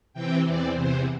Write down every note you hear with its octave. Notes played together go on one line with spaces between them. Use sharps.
C3 E3 C4 G5
E2 E3 C4 D5
E2 C3 E3 C5